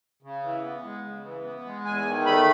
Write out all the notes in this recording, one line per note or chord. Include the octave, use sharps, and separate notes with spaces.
C#3
E3
B3
G#3
C#3
E3
B3
G#3
E2 G#5
D#3
A3 B5